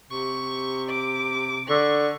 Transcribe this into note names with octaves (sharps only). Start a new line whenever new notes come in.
C3 C#6
D6
D3 C#6